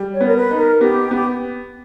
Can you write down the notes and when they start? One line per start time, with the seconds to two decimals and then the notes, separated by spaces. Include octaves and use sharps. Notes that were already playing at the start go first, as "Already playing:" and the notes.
Already playing: G3
0.13 C#5
0.21 B3
0.26 A#4
0.35 B4
0.51 D#4
0.57 A#4
0.81 B3 G4
1.11 B3 G4